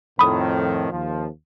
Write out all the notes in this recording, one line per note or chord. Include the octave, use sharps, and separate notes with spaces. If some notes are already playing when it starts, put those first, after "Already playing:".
F2 A2 D#3 B5 D#6
D#2 F3